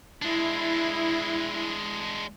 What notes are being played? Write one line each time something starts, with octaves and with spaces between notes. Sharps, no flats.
G#3 D4 E4